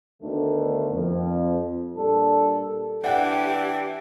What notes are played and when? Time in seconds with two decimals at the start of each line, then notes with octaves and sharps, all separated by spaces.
0.22 D2 D3 D#3 A3 B3
0.93 F2
1.96 A#2 G3 D4 A4
3.04 E3 D4 G4 D5 F#5 G5 F#6